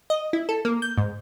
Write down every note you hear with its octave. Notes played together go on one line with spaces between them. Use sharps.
D#5
E4
A4
A#3
G6
G#2